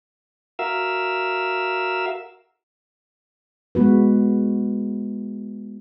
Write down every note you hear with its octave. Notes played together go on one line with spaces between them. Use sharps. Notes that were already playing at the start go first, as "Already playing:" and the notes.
F#4 A#4 E5 F5 E6
G#3 B3 F#4 B4